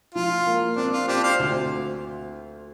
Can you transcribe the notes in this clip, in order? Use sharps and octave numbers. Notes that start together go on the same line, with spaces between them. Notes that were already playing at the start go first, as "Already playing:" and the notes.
F3 F4
A#3
C4 D4
F4
C4 D4 G4
C5 F5
D2